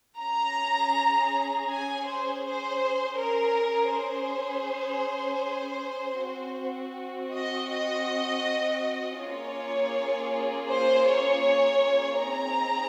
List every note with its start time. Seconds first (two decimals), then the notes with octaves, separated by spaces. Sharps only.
0.19 C#4 G#4 A#5
1.69 G#5
2.06 C5
2.44 C5
3.19 C#4 G#4 A#4
3.95 C5
6.20 C4 F#4
7.32 D#5
7.70 D#5
9.20 A#3 C#4 F4 G#4 C#5
10.71 C5
11.08 C#5
12.21 C4 D#4 G#4 A#5